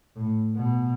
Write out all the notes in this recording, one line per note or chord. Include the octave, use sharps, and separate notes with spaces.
A2
B2